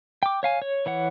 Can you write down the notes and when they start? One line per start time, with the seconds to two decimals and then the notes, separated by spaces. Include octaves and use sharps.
0.23 G5 D6
0.43 C#5 F5 G#5
0.62 C#5
0.86 E3 C#5 F#5